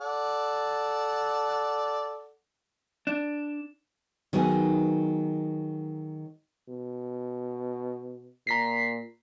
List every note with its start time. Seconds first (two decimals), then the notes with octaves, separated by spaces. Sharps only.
0.01 A4 D5 F#5
3.07 D4
4.33 D#3 F#3 B3 D#4 G#4
6.69 B2
8.47 A#2 A#5 B6 C7